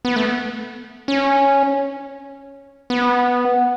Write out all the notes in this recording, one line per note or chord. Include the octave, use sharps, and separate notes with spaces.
B3
A3
C#4
B3